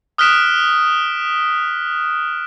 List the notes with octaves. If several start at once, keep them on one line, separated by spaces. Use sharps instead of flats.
D#6 F6 F#6 B6 D7 E7